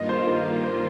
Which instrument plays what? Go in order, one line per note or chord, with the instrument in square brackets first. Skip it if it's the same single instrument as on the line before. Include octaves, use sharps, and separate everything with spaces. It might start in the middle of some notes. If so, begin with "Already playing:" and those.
Already playing: [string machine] G2 D#3 A#3 F4 [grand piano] D#5
[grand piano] C5
A#4
A#4
C5